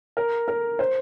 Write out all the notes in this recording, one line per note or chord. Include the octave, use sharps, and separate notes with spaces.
A#4
A#4
C5